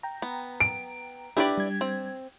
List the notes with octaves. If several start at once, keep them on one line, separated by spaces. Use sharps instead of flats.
G5 A#5
B3
D7
D4 E4 G4 B4 D5
G3 G#6
C4